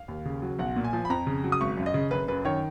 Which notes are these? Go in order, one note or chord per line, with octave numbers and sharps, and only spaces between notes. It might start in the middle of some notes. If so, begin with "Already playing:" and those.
Already playing: F5
D#2
C#3
F#3
B1 F#5
A#2
G#5
F3
B5
F2 A#5
C#3
F#3
D#6
G#1 C#6
F#2
D#5
C#3
F#1 B4
F#2 B4
D#3 C#5